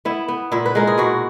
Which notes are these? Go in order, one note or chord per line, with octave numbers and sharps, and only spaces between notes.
B3 E4
B3
A#2 E4
B4
G#3 A#4
G#4
B2 F#4